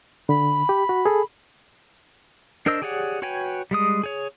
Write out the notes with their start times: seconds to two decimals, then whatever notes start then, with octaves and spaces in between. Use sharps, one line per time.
0.29 D3 B5
0.69 G4
0.89 F#4
1.06 G#4 A4
2.66 D4 A#4 C5 D#5 E6
2.82 G4 G#4 C#5 D5 F#5
3.22 F#4 B4 C#5 G5 G#5
3.71 G3 G#3 D#6
4.03 G#4 C#5